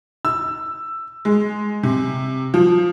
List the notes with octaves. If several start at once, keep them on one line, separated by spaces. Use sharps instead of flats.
E6
G#3
C3
F3